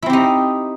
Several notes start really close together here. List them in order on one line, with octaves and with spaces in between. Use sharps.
E4 C4 G4 D#4